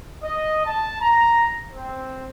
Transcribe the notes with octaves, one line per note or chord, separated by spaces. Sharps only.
D#5
A5
A#5
C4